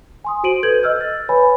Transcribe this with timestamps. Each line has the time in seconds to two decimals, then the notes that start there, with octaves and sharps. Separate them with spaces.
0.24 G#5 C6 D#6
0.44 F#4 C5 D7 D#7 F#7
0.63 A4 B4 G6 G#6 F#7
0.83 D#5 E6 F6 G6
1.01 A6
1.29 B4 C#5 G#5 B5